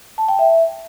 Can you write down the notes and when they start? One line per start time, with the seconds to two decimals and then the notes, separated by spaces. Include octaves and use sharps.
0.18 A5
0.28 G5
0.39 E5